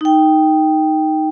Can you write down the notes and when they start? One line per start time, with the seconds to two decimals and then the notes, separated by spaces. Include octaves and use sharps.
0.01 D#4 G5